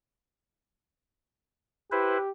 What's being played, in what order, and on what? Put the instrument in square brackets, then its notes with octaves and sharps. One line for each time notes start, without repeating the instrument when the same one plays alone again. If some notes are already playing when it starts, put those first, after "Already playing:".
[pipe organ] E4 B4 C5 [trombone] G4